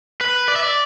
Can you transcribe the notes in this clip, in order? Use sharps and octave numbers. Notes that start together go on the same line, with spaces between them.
B4
D5
E5
D5